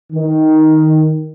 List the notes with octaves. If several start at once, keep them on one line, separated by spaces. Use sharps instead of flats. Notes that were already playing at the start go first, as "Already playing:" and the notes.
D#3